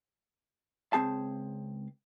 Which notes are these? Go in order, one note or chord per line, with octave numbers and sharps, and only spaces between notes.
C#2 C#3 C4 G#4 A5